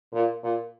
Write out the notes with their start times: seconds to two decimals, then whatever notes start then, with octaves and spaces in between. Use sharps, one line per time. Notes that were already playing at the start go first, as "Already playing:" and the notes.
0.13 A#2
0.43 A#2